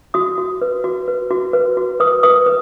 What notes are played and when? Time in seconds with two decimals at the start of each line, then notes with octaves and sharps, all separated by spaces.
0.14 F#4 D#6
0.38 F#4
0.61 B4
0.84 F#4
1.08 B4
1.30 F#4
1.53 B4
1.77 F#4
2.00 B4 D#6
2.23 B4 D#6
2.46 B4